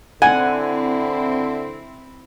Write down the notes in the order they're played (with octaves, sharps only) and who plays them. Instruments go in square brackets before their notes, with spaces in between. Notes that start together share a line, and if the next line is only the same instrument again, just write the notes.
[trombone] D3 [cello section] C4 E4 [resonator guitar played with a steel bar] F#5 [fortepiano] G#5